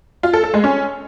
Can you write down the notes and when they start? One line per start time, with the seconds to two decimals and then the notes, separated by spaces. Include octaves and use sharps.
0.23 F4
0.33 A4
0.44 A4
0.54 G#3
0.64 C#4